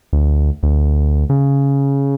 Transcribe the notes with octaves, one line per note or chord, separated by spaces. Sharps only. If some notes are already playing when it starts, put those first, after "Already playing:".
D2
D2
C#3